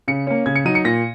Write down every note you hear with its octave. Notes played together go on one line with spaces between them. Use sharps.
C#3 C#7
A#3 C#4
C#3 G#6
C#7
F#3 D#4 D#7
C#7
A#2 A#6